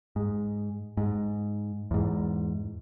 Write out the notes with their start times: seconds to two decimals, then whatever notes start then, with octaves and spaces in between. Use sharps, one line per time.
0.16 G#2
0.97 G#2
1.91 E2 G#2